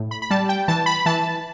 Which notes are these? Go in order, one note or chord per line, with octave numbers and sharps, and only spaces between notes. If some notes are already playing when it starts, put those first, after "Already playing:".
Already playing: A2
B5
B5
G3 A5
G5
E3 A5
B5
E3 A5